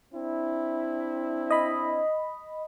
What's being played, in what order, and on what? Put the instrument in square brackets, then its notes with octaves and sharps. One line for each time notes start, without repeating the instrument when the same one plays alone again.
[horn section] C4 D4 E4
[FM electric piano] D#5 B5